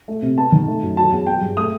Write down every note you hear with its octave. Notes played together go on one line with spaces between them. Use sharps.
A3
C3
B3 A5
D#3
A3
F#2
F#3 A5
E2
F#3 G5
G2
A3 D#6